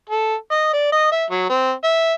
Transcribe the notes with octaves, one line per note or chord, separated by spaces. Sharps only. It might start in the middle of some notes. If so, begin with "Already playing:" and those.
A4
D#5
D5
D#5
E5
F#3
C4
E5